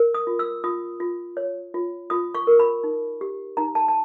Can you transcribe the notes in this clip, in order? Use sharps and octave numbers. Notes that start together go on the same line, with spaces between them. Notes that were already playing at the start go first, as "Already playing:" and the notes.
Already playing: A#4
D#6
F4
E6
F4 D#6
F4
C#5
F4
F4 D#6
C#6
A#4
B5
D#4
G4
D#4 A#5
A5
A5